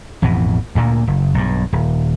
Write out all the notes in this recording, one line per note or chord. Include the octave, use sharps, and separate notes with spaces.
A1 F2 B2 E3
D2 A#2 A#3
F#1
B1 G2
D#1